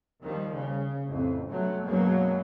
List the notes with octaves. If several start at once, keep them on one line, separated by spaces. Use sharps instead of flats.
D#2 D#3 F3 G3
C#3
A1 F2
G2 B2 F#3 A3
F#2 B2 F#3 G#3 A#3